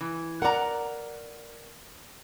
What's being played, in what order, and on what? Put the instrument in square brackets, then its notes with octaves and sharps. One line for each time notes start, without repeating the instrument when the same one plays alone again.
[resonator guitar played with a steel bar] E3
[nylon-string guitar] A#4 D5 [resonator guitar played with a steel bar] F#5 A#5